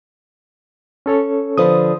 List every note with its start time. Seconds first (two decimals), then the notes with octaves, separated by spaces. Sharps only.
1.06 C#4 A4 C#5
1.57 D3 F3 B4 D#6